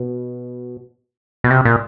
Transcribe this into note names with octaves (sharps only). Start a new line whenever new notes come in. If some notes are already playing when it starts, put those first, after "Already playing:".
Already playing: B2
B2
C3
A#2